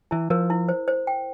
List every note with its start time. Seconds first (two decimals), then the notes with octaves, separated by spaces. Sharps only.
0.11 E3 E4
0.30 F3 A#4
0.50 E4
0.69 C5
0.88 C5
1.07 G5